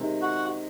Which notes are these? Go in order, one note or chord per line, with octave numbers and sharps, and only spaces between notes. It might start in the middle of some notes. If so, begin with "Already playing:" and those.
Already playing: C3 D#3 G#3
F#4